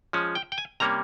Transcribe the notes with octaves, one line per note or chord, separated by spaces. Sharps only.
F3 G#3 C#4
G5
G5
G#5
C3 G3 A#3 C#4 A#5